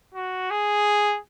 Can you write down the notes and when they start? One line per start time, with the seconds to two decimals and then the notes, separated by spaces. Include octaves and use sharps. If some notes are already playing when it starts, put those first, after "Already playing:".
0.14 F#4
0.50 G#4